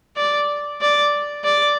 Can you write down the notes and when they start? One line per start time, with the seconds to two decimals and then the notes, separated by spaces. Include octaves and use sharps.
0.16 D5
0.81 D5
1.44 D5